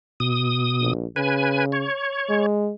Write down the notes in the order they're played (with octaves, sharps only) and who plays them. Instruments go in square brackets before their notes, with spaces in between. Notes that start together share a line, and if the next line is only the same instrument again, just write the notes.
[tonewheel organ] B2 D#6
[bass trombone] A#1
[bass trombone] C#3 [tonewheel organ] B4 G#5
[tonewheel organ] C#5
[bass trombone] G#3